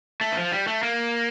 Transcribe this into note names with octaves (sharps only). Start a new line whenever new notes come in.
A3
E3
F3
G3
A3
A#3